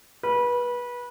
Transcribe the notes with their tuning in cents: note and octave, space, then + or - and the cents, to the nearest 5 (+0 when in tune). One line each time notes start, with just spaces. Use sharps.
B4 -25